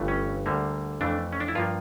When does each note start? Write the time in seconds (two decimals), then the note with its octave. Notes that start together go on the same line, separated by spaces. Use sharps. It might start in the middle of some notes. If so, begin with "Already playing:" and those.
Already playing: G1 G2 E3 A3
0.08 C#4
0.46 D2 D3 G3 A#3
1.01 F2 E3 A3 D4
1.33 C#4
1.40 D4
1.48 E4
1.55 G2 F3 A#3 F4